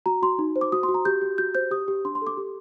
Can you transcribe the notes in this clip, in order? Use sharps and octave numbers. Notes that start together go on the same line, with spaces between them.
F#4 A#5
F#4 C6
D#4
C5
D6
F#4 D#6
C6
F#4
A#5
G4 G6
G4
F#4 G6
C5 G6
G4 D#6
G4
D4 C6
C6
A4
D6
G4